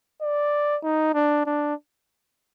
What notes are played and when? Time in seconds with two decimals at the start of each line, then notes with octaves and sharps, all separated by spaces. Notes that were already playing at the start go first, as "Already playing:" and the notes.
0.22 D5
0.83 D#4
1.14 D4
1.46 D4